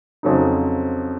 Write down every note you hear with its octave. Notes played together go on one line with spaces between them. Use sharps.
F2 C#3 F#3 C4 D#4